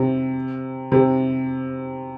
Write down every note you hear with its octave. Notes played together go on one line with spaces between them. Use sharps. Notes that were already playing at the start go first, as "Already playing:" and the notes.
Already playing: C3
C3